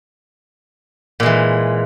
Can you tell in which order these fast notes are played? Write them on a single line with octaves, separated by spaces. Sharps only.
A#2 G#3 E3